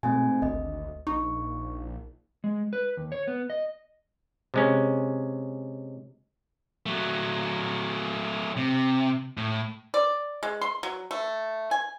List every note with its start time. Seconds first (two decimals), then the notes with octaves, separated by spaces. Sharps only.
0.03 G#2 B2 A3 C4 G#5
0.42 G#1 D2 D#5
1.07 A#1 D#4 C#6
2.44 G#3
2.73 B4
2.97 D#2
3.12 C#5
3.27 B3
3.50 D#5
4.54 C3 G#3 C#4
6.86 F#3 A3
8.57 C3
9.37 A2
9.94 D5
10.43 G#3
10.61 C6
10.83 F#3
11.11 A3
11.71 G#5